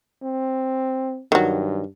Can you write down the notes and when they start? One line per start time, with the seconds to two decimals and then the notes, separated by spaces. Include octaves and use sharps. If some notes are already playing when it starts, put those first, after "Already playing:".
0.23 C4
1.32 G2 D#3 F#3